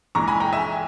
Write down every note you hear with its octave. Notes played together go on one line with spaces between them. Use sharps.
A#1 G#2 E3 A#5 C#6
G#5 B5
G5 A#5
E5 G#5